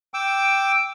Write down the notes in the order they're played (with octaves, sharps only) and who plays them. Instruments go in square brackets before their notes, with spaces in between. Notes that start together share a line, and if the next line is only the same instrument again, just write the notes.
[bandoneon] G5 D6 E6